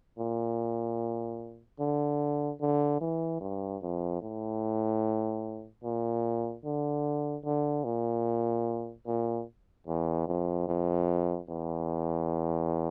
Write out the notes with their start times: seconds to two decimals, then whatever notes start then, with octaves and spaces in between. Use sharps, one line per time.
0.18 A#2
1.80 D3
2.61 D3
3.01 E3
3.41 G2
3.82 F2
4.22 A2
5.83 A#2
6.64 D3
7.45 D3
7.84 A#2
9.06 A#2
9.87 E2
10.27 F2
10.67 F2
11.48 E2